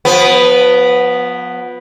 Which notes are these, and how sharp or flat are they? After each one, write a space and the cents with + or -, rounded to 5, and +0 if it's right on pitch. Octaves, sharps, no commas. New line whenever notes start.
F3 +40 B3 +0